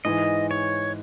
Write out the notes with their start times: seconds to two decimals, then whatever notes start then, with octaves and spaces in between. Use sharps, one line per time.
0.05 G#2 E3 G#3 D#5
0.51 C#5